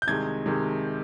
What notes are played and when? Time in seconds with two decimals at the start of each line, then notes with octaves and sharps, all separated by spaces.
0.02 G6
0.07 C2 C3 D#3 G#3 G#6
0.46 C3 D#3 G#3